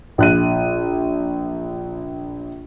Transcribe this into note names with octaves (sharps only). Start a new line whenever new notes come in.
A#1 F#6 D#7